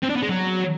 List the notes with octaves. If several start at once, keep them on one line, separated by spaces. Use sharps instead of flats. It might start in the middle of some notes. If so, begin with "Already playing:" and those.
C4
D4
B3
G#3
F#3